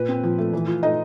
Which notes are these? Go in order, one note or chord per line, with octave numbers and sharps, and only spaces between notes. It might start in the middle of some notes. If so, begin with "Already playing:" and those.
Already playing: A#2 B4
C4
F3
A3
E3
F4
A3 D#4 D#5